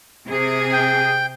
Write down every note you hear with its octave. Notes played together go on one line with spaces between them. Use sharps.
C3 G#4
G5